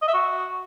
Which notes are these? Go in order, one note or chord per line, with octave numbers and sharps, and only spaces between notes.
D#5
E5
F#4